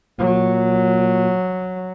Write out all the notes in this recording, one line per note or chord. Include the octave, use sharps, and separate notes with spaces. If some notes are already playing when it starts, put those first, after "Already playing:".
A#2 F#3